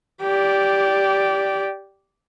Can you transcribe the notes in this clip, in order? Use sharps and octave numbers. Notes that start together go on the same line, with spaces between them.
G4 D5